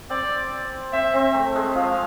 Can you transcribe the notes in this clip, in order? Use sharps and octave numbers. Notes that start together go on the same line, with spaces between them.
C4 D5
C4 E5
C4
A3
G#3
F3 F5